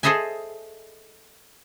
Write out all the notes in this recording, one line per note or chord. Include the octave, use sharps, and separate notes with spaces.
G#4 A4 C5 D#5 E5 G#5